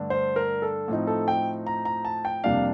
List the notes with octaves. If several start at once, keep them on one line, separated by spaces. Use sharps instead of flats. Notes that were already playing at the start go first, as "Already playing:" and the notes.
Already playing: G2 D3 A3 D4
C5
A#4
A4
A2 F3 C4 D#4
A4
G5
A#5
A#5
A5
G5
F2 C3 G3 A#3 D4 F5